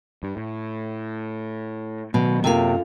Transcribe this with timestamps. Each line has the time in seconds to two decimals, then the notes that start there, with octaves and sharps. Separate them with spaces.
0.23 G2
0.37 A2
2.14 B2 D#3 F#3 B3
2.44 F#2 C3 A#3 F4 A4 F5